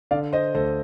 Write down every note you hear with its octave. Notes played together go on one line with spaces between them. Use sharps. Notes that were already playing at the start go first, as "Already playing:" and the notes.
D3 D5 F5
C5 D#5
D2 A4 C5